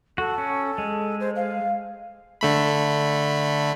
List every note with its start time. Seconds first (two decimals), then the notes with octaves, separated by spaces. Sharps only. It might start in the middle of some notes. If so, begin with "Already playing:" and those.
0.18 F#4 A4
0.38 C#4
0.78 G#3
1.20 C5
1.36 F5
2.41 D3 A3 B5